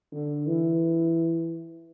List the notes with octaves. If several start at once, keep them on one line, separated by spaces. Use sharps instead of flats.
D3
E3